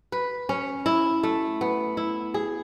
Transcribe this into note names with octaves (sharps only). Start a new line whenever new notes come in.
B4
C#4
E4
A3
B3
E4
G#4